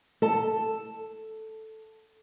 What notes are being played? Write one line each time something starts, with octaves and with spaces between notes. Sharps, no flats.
A4 A5